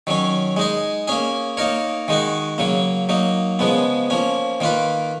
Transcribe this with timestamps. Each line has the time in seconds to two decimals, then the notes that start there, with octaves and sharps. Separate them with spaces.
0.07 D#3 F#3 C#4
0.57 G#3 D#4 G#4
1.08 A#3 C#4 G#4
1.57 A#3 D#4 A#4 C#5
2.08 D#3 G#3 D#4 F#4
2.58 C#3 F#3 A#3
3.09 F#3 A#3 D#4
3.59 C#3 F3 G#3 B3
4.10 F3 A#3 C#4
4.60 D#3 A#3 F4 B4